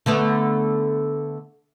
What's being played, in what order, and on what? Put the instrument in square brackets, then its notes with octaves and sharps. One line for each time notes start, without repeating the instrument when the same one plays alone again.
[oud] D3 A3 B3